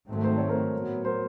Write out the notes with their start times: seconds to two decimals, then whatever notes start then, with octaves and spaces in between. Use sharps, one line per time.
0.08 G#2 D#3 F#3 A3 C4
0.24 C5
0.38 C#5
0.49 A#4 C5
0.73 A2 F#3 B3
1.05 A#4 C5